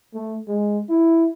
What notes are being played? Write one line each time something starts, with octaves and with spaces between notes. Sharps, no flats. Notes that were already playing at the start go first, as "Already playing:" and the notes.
A3
G#3
E4